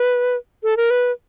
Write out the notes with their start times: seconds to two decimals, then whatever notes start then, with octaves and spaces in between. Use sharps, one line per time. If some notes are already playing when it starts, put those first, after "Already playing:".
Already playing: B4
0.64 A4
0.77 A#4
0.90 B4